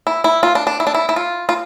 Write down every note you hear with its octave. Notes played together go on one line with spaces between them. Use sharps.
E4
E4
F4
D4
D4
E4
D4
E4
E4
F4
F4